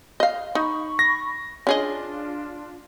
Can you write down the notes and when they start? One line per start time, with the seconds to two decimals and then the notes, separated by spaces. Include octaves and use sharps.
0.20 D#5 F5
0.55 D#4 B5 C#6
0.99 A#6
1.67 C#4 D4 F4 G#4 D#5